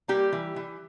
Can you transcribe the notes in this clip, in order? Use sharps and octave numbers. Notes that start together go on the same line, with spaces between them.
G3 A#3 G4
E3
E3